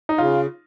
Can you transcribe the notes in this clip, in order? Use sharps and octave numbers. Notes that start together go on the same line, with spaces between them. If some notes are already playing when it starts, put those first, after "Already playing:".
D#4
C#3 F4